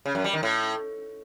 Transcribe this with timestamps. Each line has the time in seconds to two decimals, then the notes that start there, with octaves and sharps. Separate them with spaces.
0.06 C#3
0.15 F#2
0.24 G3
0.34 D#3
0.43 A2